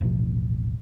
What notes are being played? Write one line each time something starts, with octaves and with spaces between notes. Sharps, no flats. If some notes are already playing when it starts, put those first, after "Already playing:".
D#1 A1 B2 F3